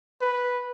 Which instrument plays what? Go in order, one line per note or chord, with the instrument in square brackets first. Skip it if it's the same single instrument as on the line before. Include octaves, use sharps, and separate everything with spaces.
[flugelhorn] B4